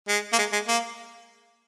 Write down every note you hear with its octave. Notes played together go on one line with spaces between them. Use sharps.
G#3
A#3
G#3
G#3
A#3